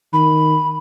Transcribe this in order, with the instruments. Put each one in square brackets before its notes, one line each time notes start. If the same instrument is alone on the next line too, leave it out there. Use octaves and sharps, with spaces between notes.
[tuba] D#3 [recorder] B5